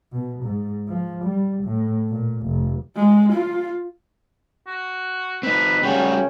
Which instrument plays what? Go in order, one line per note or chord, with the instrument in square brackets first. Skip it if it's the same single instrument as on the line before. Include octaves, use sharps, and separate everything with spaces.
[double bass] B2
G#2
F3
G3
A2
A#2
F1
[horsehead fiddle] G#3
F4
[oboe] F#4
[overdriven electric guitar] C4 D#4 [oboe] B4
[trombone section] G#1 C#3 C#4 [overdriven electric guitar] G3 F#4 [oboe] G5